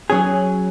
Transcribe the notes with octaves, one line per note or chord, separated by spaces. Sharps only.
F#3 C#4 G#4